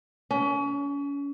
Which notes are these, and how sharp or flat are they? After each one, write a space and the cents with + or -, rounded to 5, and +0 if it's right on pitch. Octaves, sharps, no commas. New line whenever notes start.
C#4 +35